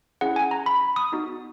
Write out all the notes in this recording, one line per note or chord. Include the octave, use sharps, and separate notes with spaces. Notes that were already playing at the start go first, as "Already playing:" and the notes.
C#4 E4 G#4 F#5
G#5
A#5
B5
D#6
B3 D#4 F#4